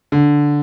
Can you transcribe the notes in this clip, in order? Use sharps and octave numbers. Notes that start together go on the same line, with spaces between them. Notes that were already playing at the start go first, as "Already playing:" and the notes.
D3